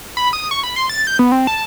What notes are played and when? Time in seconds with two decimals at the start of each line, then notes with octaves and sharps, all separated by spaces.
0.17 B5
0.33 D#6
0.51 C#6
0.63 B5
0.76 C6
0.89 A6
1.07 G6
1.19 B3
1.32 C4
1.47 A5